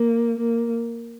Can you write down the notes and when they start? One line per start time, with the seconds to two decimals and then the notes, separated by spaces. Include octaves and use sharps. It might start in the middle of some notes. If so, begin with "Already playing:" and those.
Already playing: A#3
0.37 A#3